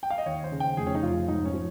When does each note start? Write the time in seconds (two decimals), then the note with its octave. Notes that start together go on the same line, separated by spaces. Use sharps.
0.03 G5
0.10 F5
0.18 D#5
0.26 D#2 C#5
0.44 C5
0.52 C#3
0.60 G5
0.77 F1 G#4
0.87 C#4
0.95 D#4
1.03 F1 F4
1.28 G#2 D#4
1.45 C#4
1.54 F3